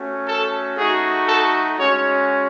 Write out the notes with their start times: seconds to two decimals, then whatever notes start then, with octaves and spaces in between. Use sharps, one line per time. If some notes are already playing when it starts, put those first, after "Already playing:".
Already playing: A3 C#4 F#4
0.28 A4
0.77 A3 D#4 F#4 G#4
1.27 A4
1.77 G#3 C#4 F#4 C#5